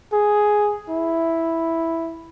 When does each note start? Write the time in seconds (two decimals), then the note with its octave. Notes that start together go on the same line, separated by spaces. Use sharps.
0.13 G#4
0.89 E4